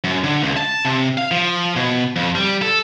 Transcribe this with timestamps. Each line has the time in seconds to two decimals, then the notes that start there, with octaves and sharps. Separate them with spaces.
0.04 F#2
0.24 D3
0.43 C#2
0.57 A5
0.85 C3
1.17 F5
1.31 F3
1.76 B2
2.16 F2
2.35 G3
2.62 A4